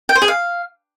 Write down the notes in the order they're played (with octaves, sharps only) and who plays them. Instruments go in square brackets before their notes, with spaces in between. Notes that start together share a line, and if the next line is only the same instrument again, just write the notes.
[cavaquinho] G5
C5
G#4
F5